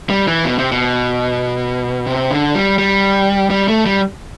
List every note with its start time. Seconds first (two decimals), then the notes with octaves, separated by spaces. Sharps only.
0.10 G3
0.28 E3
0.45 B2
0.59 C3
0.72 B2
2.07 C3
2.31 D3
2.55 G3
2.78 G3
3.50 G3
3.68 A3
3.86 G3